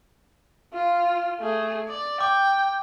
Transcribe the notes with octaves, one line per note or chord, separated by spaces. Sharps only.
F4
A3 G#4
D5
G5 D6